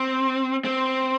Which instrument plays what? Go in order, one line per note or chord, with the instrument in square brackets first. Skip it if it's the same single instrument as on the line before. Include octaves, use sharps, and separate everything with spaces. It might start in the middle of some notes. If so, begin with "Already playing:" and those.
Already playing: [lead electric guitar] C4
C4